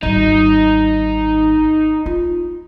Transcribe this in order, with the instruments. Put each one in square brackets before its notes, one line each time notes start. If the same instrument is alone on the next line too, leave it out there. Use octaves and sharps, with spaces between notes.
[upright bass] G#1 G3 [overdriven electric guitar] D#4
[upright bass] F4